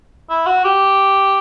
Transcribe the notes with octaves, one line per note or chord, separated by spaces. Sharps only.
E4
F#4
G4